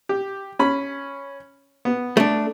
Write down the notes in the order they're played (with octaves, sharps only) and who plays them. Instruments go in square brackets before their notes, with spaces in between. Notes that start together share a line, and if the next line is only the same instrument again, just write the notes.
[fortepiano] G4
C#4 B5
B3
[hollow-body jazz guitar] A3 D4